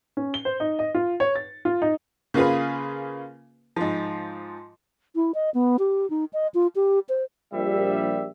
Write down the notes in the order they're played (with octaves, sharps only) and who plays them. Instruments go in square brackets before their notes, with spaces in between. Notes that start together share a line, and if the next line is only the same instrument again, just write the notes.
[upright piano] C#4
G7
C5
D#4
D#5
F4
C#5
A6
F4
D#4
[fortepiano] C#3 A#3 F4 G#4 B4
G#2 F3
[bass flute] E4
D#5
B3
G4
D#4
D#5
F4
G4
C5
[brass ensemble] A#1 G3 E5